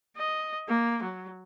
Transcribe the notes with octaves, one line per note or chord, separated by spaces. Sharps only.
D#5
A#3
F#3